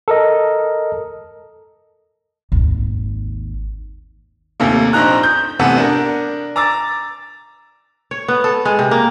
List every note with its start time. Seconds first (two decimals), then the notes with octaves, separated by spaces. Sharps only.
0.08 A4 A#4 D#5
2.52 G#1 D#2
4.60 D#2 C3 A3 A#3
4.93 A#1 C4 D#4 A#5 F#6
5.23 G6
5.59 A2 C3 E3 B3 A4
5.77 D4 A#4
6.56 A#5 D6 E6 A6
8.11 C#5
8.28 B3
8.44 A4
8.65 G#3
8.79 C3
8.91 A#3